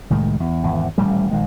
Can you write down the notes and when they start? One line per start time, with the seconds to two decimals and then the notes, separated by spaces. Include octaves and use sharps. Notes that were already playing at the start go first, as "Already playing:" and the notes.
0.10 C2 A2 D#3 G#3
0.40 E2
0.63 G#1 E2
0.98 D#1 A1 G3 A3
1.31 A#1 D#3 G#3